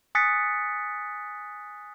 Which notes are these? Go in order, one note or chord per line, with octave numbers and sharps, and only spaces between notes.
G#5 D#6 F#6 A6 B6 C#7